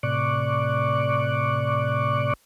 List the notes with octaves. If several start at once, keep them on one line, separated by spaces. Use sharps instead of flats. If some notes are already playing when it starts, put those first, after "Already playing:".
A2 C3 D5 C#6 D6 F#6